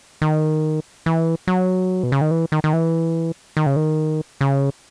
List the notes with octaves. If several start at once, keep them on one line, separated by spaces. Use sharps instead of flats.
D#3
E3
F#3
B2
C#3
D#3
E3
D#3
D#3
E3
D#3
C#3
D#3
C#3